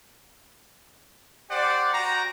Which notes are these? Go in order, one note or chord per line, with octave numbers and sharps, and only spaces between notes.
G4 C5 D5 F#5
F#4 G5 A#5